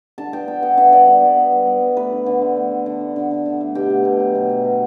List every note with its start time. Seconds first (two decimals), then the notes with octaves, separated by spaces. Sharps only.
0.18 D3 A5
0.33 B3 G5
0.48 B3 G5
0.63 B3 F#5
0.77 D3 E5
0.92 G3 D5
1.07 D3
1.22 B3
1.37 B3
1.52 G3
1.67 B3
1.82 B3
1.96 A3 B4
2.12 D3
2.26 D3
2.42 A3
2.56 A3
2.71 D3
2.86 D3
3.01 A3
3.16 D3
3.31 D3
3.46 D3
3.61 A3
3.75 B2 G4
3.90 A3
4.05 B2
4.20 F#3
4.35 B2
4.50 F#3
4.64 B2